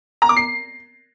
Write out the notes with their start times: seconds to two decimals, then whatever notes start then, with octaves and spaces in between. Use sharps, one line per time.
0.22 A#5
0.29 D6
0.37 C7